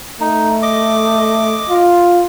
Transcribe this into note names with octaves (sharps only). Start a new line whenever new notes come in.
A3 D#4
D#5 D6
F4